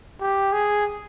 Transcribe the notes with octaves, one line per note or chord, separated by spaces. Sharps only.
G4
G#4